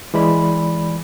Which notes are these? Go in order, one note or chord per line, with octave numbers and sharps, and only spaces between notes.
E3 G#3 D5 B5